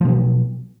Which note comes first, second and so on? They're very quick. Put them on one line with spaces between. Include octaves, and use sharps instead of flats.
F3 B2 F#3